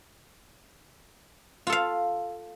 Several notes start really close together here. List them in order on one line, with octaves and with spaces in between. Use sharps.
F4 A4 F5